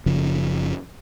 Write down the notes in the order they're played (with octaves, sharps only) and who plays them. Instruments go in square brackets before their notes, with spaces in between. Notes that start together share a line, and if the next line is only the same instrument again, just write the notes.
[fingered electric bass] F#1 C#3 F3